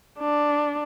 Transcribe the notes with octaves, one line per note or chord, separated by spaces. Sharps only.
D4